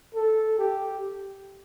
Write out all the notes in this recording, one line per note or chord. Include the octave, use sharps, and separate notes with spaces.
A4
G4